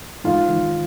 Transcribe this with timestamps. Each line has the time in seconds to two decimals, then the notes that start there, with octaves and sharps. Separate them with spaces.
0.24 G#2 F4
0.48 D#3